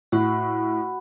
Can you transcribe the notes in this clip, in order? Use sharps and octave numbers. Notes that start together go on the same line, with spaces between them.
A2 F#4 F#5 B5